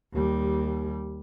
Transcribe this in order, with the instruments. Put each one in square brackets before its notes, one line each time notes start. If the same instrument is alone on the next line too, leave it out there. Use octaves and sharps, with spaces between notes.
[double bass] D#2 G3